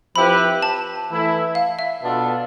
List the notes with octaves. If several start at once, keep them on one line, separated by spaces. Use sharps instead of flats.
F3 C4 E4 G4 B4 B5
A5
E3 A3 E4 A4
F5
E5
B2 B3 D4 F4 A4